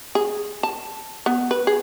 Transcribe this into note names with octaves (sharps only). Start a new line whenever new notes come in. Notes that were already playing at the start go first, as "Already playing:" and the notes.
G#4
A5
B3
B4
G#4